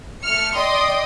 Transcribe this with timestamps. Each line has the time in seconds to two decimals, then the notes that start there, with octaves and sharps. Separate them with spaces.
0.23 A3 F6 C#7
0.55 D5 D#5 G5 C6 D#6